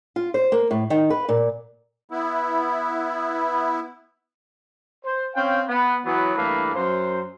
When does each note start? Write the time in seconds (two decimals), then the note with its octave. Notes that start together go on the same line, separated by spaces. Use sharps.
0.16 F4
0.34 C5
0.52 A#3
0.71 A2
0.90 D#3
1.10 B4
1.29 A#2
2.10 B3 E4
5.04 C5
5.35 C4 C#4 F5 G5
5.68 B3
6.05 E3 F#3 B3
6.35 G2 E3 A3 A#3 A4 B4
6.75 F#2 C5